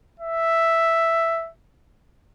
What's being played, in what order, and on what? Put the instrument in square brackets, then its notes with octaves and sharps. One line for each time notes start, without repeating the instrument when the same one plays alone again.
[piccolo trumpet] E5